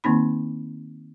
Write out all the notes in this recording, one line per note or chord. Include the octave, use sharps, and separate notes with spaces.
D#3 A#3 C4 D#4 B5